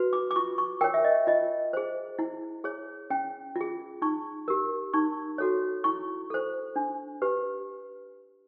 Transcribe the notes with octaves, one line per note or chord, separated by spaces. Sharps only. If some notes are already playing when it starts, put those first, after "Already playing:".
Already playing: F#4 B4
D6
D6
F4 C#6
C#6
A#4 C#5 G5
E5
D#5
F4 D#5
G#4 C5
E4
G#4 C#5
C#4 G5
F4 G#4
D#4 C#6
G4 A#4
D#4 C#6
F#4 A4 C#5
E4 C#6
A4 C5
D4
G4 B4